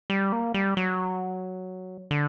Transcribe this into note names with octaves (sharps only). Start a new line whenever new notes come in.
G3
A#3
G3
F#3
D3